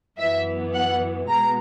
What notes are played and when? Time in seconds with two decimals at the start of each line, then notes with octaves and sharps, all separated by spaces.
0.18 F#2 E3 B3 E5
0.73 F#5
1.29 B2 G#3 B3 A#5